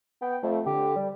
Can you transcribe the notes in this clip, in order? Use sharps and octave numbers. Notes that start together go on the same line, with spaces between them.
B3 G5
F2 A3
D3 G4
G3